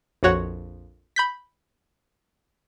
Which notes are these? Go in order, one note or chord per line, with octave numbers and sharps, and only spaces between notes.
A#1 F2 F#4 C#5 F#5
B5 G6 B6